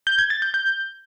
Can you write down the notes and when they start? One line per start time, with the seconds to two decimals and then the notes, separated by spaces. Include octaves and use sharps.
0.07 G6
0.19 G#6
0.30 A6
0.42 G6
0.54 G6